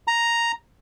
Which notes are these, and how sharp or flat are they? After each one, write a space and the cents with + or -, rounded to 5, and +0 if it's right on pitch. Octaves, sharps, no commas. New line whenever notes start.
A#5 +0